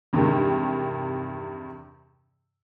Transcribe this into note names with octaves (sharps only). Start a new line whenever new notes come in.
E2 G2 C3 D#3 G#3